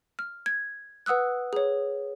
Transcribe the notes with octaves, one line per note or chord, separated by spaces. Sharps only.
F6
G#6
B4 F#5 D#6 E6 F#6
G#4 C#5